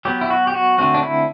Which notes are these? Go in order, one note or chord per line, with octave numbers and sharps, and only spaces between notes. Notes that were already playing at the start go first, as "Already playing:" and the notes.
F#3 B3 G4
E4
F#4
G4
F#4
D3 A3 C4 F#4
D4
E4